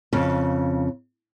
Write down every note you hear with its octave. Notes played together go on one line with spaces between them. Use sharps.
F2 C#3